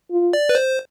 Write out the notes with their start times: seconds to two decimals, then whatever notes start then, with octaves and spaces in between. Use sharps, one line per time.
0.11 F4
0.33 D5
0.49 B4
0.55 C5